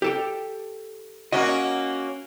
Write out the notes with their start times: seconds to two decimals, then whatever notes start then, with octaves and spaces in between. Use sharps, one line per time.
0.02 G4 A4 G5
1.32 A#3 C#4 F#4 D#5